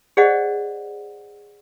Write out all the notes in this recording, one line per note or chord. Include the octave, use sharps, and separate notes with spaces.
G#4 C5 D5 D#5 F#5